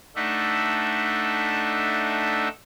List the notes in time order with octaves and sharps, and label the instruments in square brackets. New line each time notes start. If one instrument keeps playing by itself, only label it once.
[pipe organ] A3 D4 D#4 E5 F#5